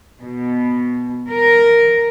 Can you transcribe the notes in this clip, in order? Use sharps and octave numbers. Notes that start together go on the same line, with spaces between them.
B2
A#4